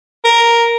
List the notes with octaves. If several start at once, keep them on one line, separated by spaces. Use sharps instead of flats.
A#4